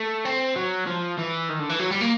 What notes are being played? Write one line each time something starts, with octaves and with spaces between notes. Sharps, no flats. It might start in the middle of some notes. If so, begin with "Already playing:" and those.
Already playing: A3
C4
F#3
F3
E3
D#3
D3
E3
F#3
G3
A#3